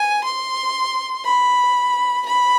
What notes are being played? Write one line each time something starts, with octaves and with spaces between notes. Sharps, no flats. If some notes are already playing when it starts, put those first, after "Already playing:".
Already playing: G#5
C6
B5
B5